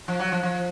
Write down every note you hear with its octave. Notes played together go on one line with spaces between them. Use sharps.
F3
F#3
F3
F3